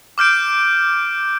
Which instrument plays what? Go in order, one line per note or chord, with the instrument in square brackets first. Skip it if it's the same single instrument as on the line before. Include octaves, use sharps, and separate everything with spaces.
[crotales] D6 F6 G6 D7